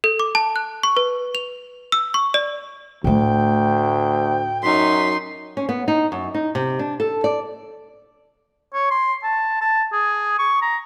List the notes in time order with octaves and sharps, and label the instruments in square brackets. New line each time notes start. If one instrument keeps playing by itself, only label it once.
[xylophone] A4
D6
A5
F#6
C#6
B4
F7
E6
C#6
D5
[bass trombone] D2 [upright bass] A2 A3 [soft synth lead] G5
[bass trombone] F#2 [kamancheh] D#4 C6 [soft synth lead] B6
[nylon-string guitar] C#4
B3
D#4
F#2
D#4
C3
D4
A4
D5
[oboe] C#5
C6
A5
A5
G#4
C#6
A#5